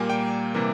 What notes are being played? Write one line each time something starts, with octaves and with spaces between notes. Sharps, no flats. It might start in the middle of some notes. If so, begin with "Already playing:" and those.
Already playing: A#2 G3 A#3 G#5
G5
C3 E3 G3 A#3